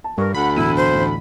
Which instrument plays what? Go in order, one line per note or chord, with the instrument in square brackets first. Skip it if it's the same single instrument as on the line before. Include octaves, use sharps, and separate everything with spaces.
[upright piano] A5
[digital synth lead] G2 [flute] A#4 [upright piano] C#6
[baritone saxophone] D2 [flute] F#5 [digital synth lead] B5
[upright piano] E1 A2 D#7 [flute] E4
[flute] C5
[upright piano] A1 A2